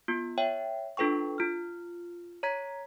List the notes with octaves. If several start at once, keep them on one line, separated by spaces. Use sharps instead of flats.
B3 F4
C#5 E5 G5
D4 F4 A4 B4 G5 C#6
F4 F6
C#5 A#5 G#6 B6